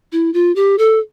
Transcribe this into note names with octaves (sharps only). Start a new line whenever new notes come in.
E4
F4
G4
A4